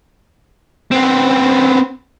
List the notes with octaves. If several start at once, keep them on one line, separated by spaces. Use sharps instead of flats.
B3 C4